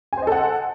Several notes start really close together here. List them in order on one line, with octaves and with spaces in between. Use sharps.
G#5 C5 D#5 A4 F#5